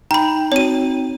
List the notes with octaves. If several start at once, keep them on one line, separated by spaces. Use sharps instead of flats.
D#4 G5 A#5 B5
C4 F#4 C#5 D#7